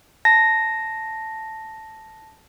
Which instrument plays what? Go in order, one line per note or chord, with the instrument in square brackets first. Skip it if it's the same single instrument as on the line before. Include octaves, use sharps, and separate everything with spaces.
[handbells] A5 A#6